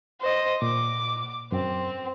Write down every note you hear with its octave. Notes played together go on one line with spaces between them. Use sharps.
C5 D#5
A#2 D6
F#2 C4